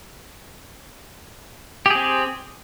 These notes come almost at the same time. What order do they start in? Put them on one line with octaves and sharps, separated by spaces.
G4 G#4 C4